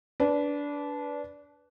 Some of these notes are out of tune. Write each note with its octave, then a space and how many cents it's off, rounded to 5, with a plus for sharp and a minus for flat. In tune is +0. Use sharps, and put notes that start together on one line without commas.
D4 -20 B4 +0